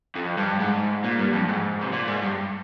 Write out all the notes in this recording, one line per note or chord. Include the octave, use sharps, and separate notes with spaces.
F2
G2
G#2
A#2
G2
F2
G#2
C3
A#2
G#2
G2